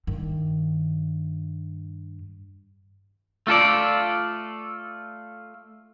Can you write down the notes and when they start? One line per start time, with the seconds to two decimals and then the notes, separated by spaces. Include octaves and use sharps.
0.07 G2 D#3
3.47 A3 F4 A4 D5